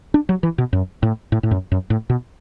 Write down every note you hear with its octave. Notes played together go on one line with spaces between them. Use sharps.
D4
F#3
E3
B2
F#2
A2
A2
A2
F#2
F#2
A2
B2